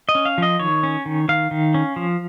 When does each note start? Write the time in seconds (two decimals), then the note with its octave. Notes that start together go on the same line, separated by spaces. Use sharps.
0.09 D#5
0.15 C#4
0.25 F5
0.38 F3 D#5
0.60 D#3 C#5
0.83 C#4
1.06 D#3
1.29 D#3 F5
1.51 D#3
1.74 C#4
1.96 F3